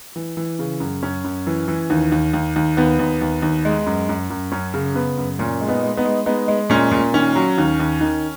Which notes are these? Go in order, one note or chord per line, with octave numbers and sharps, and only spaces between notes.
E3
E3
C#3
F#2
F#2 C#4
F#2
E3
E3
D#2
D#2
D#2
D#2
D#2 B3
D#2
D#2
D#2
G#3
F#2
F#2
F#2
F#2 C#4
C#3
C#3 B3
F#2
A#2 C#4
G#3
B3 D#4
G#3
B3 D#4
G#3
G#3 B3 D#4
G#3
A#2 C#4
A#2
D#3 C#4
F#3
D#2
D#2
D#3